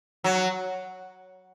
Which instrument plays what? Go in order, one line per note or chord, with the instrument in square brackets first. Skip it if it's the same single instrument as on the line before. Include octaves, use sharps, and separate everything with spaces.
[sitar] F#3